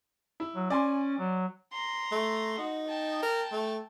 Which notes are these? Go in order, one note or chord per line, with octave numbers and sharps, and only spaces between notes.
E4
F#3
C#4 D5 G#5 C6
F#3
A#5 C6
A3
D#4 F#4
G5 A5
A#4
A3